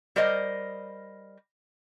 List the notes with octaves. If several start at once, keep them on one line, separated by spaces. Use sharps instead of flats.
G3 A#4 C5 D5 D#5